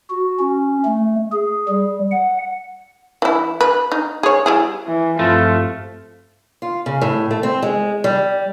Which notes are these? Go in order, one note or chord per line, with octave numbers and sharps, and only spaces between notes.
F#4
C#4
A3
G#4
G3
F#5
E3 E4
B4
D#4
G#4 C#5
G3 E4 G#4
E3
G2 F3 A3 C4
F4
C#3
A2
A3
C4
G#3
G3